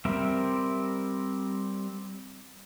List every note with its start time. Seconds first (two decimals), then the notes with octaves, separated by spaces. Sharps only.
0.05 G3 C4 A#4 E5